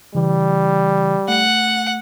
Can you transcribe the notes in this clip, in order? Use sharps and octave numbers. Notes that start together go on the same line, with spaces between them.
C#3 E3 G3
A3 F#5 C#7